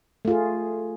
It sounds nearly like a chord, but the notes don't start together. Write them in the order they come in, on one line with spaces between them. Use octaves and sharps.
A3 F4 G#4